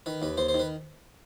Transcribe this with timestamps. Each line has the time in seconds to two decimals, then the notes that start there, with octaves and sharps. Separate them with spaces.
0.06 D#3 B4
0.22 D#2 B4
0.37 D#2 C5
0.49 C5
0.54 D#3 B4